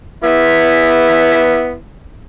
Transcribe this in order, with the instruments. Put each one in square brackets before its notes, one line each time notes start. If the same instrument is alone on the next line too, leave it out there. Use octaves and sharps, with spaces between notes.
[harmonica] B3 E4